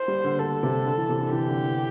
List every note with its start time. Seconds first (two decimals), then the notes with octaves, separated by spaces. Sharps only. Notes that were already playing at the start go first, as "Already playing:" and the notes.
Already playing: C5
0.08 G3
0.24 D3
0.39 D3 A4
0.63 C3
0.86 D3
0.98 E3
1.09 C3
1.21 D3
1.33 E3 G4
1.49 D3
1.64 E3